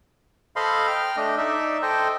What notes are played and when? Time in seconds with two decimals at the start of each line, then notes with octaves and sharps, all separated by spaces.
0.56 A4 C5 D#5 F5 B5 C6
0.87 G5 F6
1.17 A3 D4 D#5
1.38 D#4 D5 E5
1.82 A4 C5 D#5 G5